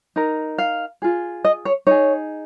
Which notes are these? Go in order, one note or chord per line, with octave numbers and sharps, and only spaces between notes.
D#4 A#4
F5
F4 G#4
D#5
C#5
D#4 G#4 C#5